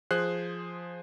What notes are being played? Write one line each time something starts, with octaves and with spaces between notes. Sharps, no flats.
F3 G#4 C5 F#6 C7